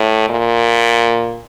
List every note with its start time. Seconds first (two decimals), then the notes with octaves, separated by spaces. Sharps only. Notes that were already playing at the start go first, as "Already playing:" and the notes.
Already playing: A2
0.30 A#2